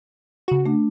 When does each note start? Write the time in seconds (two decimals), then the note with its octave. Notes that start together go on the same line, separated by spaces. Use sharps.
0.48 C#3 F#4
0.66 A3 D4